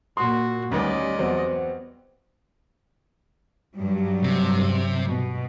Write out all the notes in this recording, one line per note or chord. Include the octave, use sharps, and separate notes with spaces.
A#2 F#4 C6
D2 D#3 G3 B3 C#4 D5 D#5
E2 F#3 B3 C4
G2 F#3 G3
C3
B2